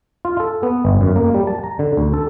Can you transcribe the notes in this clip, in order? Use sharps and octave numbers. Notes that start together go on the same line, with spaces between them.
F4
A4
B3
G1
F#2
A#3
G3
A5
A#5
D3
D2
A4